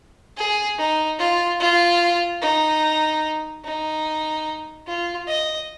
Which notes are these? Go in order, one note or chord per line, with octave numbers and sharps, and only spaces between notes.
G#4
D#4
F4
F4
D#4
D#4
F4
D#5